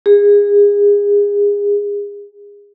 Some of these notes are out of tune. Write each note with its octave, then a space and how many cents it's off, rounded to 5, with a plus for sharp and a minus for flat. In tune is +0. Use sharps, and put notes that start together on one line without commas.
G#4 -30